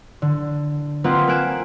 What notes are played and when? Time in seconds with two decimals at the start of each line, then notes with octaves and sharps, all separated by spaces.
0.22 D3
1.04 A#3 C4 F4 B4 D#5 F#5
1.28 A#3 G#5 F#6 D7 E7